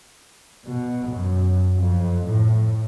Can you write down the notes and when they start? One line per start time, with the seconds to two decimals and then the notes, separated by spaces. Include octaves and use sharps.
0.66 B2
1.10 F#2
1.78 F2
2.27 A2